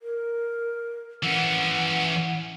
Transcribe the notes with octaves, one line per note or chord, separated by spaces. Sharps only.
A#4
E3 C#4 F#5